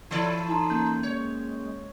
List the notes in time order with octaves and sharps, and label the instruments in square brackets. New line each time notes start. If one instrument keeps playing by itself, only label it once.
[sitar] E3 A4 D5 [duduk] E4
[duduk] D#4 [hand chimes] A5 A#5 C6
[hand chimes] A#3 C#4 G6
[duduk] G#3 [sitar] C#5